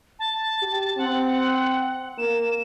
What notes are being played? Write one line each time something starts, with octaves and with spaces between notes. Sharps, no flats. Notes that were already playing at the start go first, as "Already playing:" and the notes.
A5
G4
C4 F#5
A#3 E7